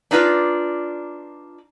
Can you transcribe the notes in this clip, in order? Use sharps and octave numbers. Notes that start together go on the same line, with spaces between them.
D4 D#4 F4 B4 D5